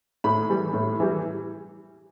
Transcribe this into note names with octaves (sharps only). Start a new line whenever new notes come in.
A2 B5
E3 G3
A2
E3 G3